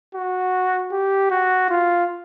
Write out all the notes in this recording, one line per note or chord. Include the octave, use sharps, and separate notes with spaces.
F#4
G4
F#4
F4